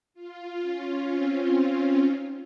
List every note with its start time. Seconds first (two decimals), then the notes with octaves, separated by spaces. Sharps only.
0.14 F4
0.61 C#4
1.09 C4
1.56 C4
2.03 D#4